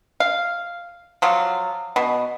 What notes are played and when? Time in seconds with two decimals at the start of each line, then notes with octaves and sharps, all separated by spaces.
0.20 F5
1.22 F3 F#3 F4
1.96 B2